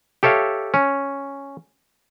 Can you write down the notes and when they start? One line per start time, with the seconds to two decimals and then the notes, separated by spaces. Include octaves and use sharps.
0.23 G4 A4 C#5 E5 F5
0.74 C#4